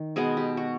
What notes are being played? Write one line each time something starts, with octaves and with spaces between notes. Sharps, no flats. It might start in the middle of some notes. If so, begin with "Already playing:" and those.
Already playing: D#3
B2 G#3 B3 G#4
G4
F#4